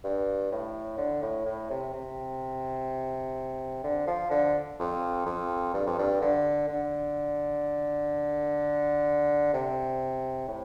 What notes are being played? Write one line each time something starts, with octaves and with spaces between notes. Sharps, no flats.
G2
A2
D3
A2
A2
C3
C3
D3
F3
D3
F2
F2
G2
F2
G2
D3
D3
C3
A2